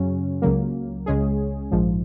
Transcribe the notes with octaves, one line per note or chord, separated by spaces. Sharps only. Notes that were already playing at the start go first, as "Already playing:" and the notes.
Already playing: F#2 C#3 F#3 C#4
C#2 C#3 F#3 A#3
C#2 C#3 G#3 C#4 G#4
A#1 G#2 F3